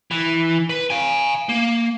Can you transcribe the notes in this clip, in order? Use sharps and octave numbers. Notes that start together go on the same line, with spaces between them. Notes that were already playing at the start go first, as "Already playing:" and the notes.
E3
B4
F5 G#5
A#3